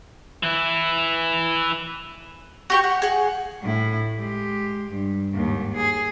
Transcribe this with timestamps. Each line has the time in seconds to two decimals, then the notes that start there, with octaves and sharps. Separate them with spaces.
0.43 E3 E4
2.70 F#4 G4 C#6
2.84 F#5
3.02 G#4 F#5
3.62 A2 E4
4.18 G#3 G4
4.91 G2
5.34 D#2 G#2
5.76 G#4